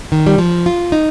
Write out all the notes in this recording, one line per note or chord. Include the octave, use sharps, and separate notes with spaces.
D#3
G3
F3
F4
D#4